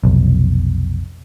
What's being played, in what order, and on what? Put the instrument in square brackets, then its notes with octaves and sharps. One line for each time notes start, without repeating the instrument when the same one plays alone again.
[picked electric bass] F1 B1